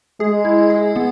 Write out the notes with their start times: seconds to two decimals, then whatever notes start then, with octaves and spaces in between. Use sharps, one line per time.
0.20 G#3 G#4
0.45 E4
0.70 G#4
0.96 B3